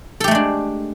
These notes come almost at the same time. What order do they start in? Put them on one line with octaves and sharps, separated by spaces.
A4 G4 A3 G#3 D4